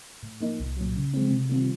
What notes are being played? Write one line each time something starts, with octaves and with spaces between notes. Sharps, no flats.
A2
F3 A#3 D#4
C2
A#2 F#3
C#3
F3 G#3 C4
C3
D#3 G3 C4 F4